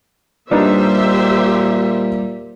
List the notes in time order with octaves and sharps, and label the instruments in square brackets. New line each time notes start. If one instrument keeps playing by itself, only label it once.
[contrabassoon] A#2 [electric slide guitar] G3 [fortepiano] D4 D#4 B4 [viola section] G4 C5 E5